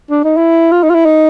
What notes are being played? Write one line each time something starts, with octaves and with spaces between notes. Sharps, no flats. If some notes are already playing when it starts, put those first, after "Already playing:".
D4
D#4
E4
F4
D#4
F4
E4
D#4